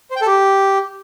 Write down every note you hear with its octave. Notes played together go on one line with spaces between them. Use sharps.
C5
G5
A4
G4